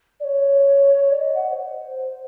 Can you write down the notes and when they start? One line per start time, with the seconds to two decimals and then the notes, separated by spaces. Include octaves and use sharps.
0.20 D5
0.24 C#5
1.11 D5
1.19 D#5
1.35 F#5
1.51 C5